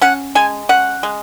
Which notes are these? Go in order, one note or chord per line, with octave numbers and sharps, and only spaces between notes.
C#4 F#5
G#3 G#5
C#4 F#5
G#3